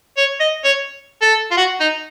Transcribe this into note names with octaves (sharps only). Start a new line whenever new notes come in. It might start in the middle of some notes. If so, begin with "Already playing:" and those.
C#5
D#5
C#5
A4
F4
F#4
D#4